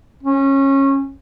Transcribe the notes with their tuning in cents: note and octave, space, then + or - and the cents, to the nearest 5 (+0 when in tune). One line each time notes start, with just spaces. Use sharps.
C#4 -20